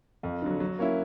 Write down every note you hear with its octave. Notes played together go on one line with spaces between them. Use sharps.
F2
D3 F#3
F#3
A#3 C#4 E4